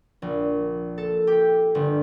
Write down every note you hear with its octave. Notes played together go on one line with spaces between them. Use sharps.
A#1
A4
G4
G1